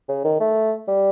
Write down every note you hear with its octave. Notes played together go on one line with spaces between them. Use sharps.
C#3
D#3
A3
G3